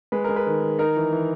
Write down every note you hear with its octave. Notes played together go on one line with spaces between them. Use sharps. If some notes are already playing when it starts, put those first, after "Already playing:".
G#3 B4
G#3 A#4
B4
D#3
D#3
D#4 A#4
E3
E3